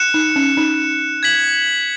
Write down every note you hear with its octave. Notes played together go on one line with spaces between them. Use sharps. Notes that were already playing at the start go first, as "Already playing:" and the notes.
Already playing: F#6 C#7 E7
D#4
C#4
D#4
G#6 B6 F#7